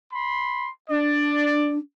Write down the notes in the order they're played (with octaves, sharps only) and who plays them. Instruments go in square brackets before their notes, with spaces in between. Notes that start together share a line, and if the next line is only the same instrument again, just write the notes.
[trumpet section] B5 C6
[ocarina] D4 [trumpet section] D5